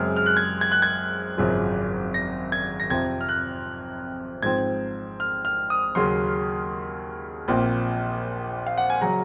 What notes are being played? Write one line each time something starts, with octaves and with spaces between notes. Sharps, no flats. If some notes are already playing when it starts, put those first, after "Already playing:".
Already playing: F#2 C#3 G#3 C4 F6
F6
F#6
G#6
G#6
F#6
G#6
G#1 F#2 C#3 F3
A#6
G#6
A#6
F2 C3 F3 C4 G#6
F6
F#6
G#2 F3 C4 G#6
F6
F6
D#6
D#2 C#3 F#3 C6
A#1 A#2 F3 C4
F5
F#5
G#5
C#3 F#3 A#5